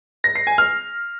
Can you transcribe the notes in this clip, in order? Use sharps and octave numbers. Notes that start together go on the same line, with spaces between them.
A#6
C7
G#5
F6